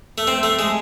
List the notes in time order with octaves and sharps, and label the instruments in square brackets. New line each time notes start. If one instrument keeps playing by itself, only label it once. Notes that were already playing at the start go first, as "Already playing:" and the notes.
[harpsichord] A3
C4
A3
G#3